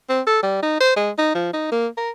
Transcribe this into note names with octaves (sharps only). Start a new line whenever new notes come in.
C4
A4
G3
D#4
C5
G#3
D#4
F3
D#4
A#3
A#4